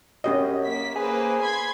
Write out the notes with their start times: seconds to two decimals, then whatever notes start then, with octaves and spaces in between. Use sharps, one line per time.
0.24 F#2 C#4 G4 D#5
0.65 A#3 B6
0.96 A#3 G#4 B4 C5
1.41 B5 C6 G#6